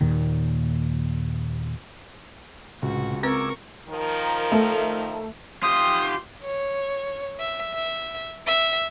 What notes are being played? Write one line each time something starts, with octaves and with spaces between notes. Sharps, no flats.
D#2 A#2 D#3
C#2 A2 C3 F#4
C4 A#4 B4 C#6 D6 E6 G#6
D#3 F3 A#4
A3 A4
F4 G4 C6 D#6
C#5
E5
E5
E5